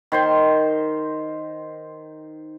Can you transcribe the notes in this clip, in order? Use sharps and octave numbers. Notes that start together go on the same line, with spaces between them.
D#3 C5 C6